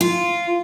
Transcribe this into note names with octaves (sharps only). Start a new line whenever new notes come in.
F4